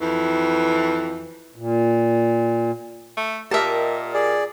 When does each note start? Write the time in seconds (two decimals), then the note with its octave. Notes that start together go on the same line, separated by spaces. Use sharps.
0.01 F2 E3
1.56 A#2
3.17 A3
3.51 A#2 G4 A#4 D#5 E5 A5
4.14 G#4 D5